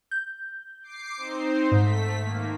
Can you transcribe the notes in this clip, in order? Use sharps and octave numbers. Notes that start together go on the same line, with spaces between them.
G6
D6 C7
C4 D#4 C5
G#2 A3 B6
D#3 A#3